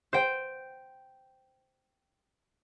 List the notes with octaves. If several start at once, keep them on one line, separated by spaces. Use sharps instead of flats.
C5 G5